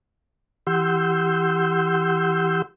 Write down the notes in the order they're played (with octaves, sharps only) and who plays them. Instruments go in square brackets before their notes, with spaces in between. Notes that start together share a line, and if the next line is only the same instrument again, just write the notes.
[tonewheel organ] E3 G4 F#5 C6 E6 G6